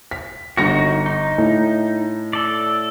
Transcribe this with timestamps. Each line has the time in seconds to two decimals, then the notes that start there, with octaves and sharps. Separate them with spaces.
0.11 B6
0.57 G1 D#4 F#4 A#6 C#7
1.06 D#4
1.38 A2
2.33 A4 D5